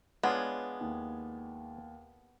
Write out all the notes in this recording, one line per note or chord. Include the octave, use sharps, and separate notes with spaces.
G#3 B3 D4 F4 C#5 F#5 G#6
D#2